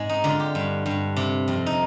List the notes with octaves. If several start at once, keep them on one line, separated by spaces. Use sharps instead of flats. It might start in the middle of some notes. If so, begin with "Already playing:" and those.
Already playing: G#2 G#3 C4
D#4
D3 F4
G4
G2
G2
C3
F2
D#4